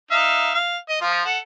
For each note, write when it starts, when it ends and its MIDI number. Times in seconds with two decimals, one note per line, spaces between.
0.11 0.54 63
0.11 0.54 76
0.11 0.54 77
0.55 0.78 77
0.89 1.01 75
1.01 1.22 53
1.01 1.22 65
1.25 1.38 69
1.25 1.38 78